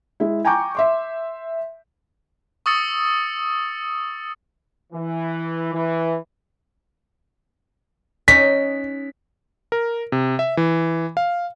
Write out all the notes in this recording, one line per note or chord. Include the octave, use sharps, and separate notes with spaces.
G#3 E4
G5 G#5 A#5 C#6 D6 G6
E5 C6 D6
C#6 D#6 E6 A6 C#7
E3
E3
C#4 D#4 B6
A#4
C3
E5
E3
F5